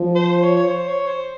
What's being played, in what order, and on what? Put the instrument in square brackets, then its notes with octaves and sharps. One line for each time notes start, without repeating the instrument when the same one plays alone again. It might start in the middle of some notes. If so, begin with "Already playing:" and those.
Already playing: [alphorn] F3
[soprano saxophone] C5
C#5
C#5
C5
C#5
C5